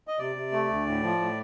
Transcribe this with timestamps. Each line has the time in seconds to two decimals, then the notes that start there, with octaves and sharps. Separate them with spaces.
0.08 D#5
0.19 C3 D5
0.36 C3
0.52 A3
0.69 D2
0.86 A2
1.03 F3
1.19 A2